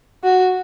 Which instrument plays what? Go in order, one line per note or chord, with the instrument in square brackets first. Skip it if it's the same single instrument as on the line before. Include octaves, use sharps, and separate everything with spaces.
[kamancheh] F#4